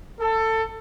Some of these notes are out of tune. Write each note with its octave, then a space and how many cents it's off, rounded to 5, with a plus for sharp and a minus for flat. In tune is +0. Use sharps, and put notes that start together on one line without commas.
A4 +20